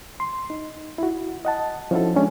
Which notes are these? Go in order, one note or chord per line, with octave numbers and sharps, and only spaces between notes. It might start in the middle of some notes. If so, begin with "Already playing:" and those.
C6
D#4
E4 F#4
D#5 F#5 A5
F3 C#4 D#4 E4 F#4 A4
G#3 C#4 D4